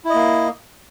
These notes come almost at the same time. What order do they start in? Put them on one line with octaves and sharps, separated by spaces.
E4 D#5 A#3